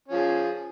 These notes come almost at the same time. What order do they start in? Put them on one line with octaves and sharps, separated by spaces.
C#4 F3 G#4